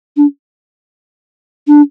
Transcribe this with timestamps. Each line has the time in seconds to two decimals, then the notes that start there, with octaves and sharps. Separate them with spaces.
0.17 D4
1.68 D4